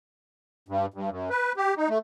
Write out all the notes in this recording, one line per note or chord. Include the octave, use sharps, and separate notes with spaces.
G2
G2
F#2
B4
G4
D#4
A3